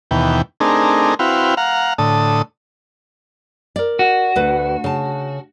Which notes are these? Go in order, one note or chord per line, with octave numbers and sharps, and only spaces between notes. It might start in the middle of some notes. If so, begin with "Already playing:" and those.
D#2 B2 E3 G5
A3 C4 D4 D#4 G#4 A#4
C4 E4 F#4 B4 F5 G5
F5 F#5 A#5
A2 D3 A5 D#6
A#4 D5
F#4
D2 B4
C#3 A5